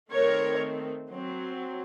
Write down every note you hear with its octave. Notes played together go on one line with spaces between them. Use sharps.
D#3 A3 C4 A#4 C#5
F#3 C4